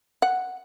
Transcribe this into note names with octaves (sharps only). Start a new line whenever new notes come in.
F#5